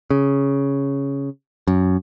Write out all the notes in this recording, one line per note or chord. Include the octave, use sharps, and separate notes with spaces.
C#3
F#2